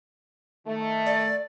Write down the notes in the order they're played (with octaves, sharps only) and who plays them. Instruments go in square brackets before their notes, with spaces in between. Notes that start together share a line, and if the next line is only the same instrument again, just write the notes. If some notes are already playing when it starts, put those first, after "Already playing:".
[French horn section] D#3 A3
[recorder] D5